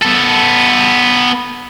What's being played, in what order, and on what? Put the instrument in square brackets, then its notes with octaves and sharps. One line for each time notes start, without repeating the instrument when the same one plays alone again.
[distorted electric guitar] B3 A4